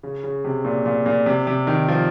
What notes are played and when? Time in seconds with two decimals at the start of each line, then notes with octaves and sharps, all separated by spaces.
0.03 C#3
0.24 C#3
0.45 C3
0.65 A#2
0.86 A#2
1.06 A#2
1.26 C3
1.47 C3
1.67 D#3
1.88 F3